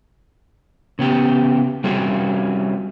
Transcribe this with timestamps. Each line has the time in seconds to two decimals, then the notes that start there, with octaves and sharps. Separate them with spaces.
0.99 C#3 B3 G4
1.84 G3 C4 C#4 F#4 G#4